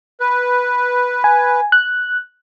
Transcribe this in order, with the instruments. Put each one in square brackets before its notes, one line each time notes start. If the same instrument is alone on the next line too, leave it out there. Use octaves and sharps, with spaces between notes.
[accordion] B4
[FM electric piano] G#5
F#6